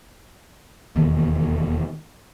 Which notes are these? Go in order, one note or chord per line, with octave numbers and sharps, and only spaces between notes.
E1 D#2